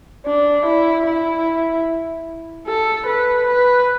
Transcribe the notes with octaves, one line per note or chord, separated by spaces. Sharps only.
D4
E4
E4
A4
B4
B4